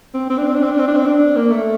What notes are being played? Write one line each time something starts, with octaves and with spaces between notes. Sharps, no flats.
C4
C4
D4
C4
D4
C4
D4
C4
D4
C4
D4
A#3
A3